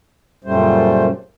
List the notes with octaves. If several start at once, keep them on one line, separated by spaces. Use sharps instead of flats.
F#2 A#2 C#3 G3 A3 C5